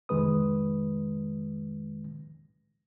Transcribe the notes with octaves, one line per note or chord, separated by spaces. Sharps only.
C2 F2 D#3 G#3 B4 D#6